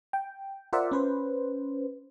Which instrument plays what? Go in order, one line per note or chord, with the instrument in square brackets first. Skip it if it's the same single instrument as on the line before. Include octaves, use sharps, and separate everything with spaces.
[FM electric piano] G5
F4 A#4 C5 D5 E5 F#5
C#4 B4 C5